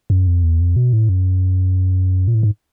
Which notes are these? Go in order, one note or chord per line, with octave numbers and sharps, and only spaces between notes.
F#2
F2
E2
F2
B2
A2
F#2
A#2
A2
G#2